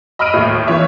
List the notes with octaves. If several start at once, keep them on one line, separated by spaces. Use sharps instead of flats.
D#5 B5 E6 F6 D7 D#7
D#2 A2
E3 F4 C#5 E5